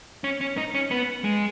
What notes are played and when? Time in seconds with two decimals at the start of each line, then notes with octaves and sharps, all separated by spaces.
0.24 C#4
0.41 C#4
0.57 D#4
0.75 C#4
0.91 B3
1.24 G#3